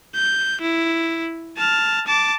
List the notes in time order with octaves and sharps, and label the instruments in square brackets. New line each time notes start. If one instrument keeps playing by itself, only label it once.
[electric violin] G6
E4
A5 F6
A5 D6